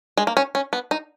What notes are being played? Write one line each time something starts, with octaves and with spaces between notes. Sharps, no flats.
G#3
A#3
C#4
C#4
B3
D#4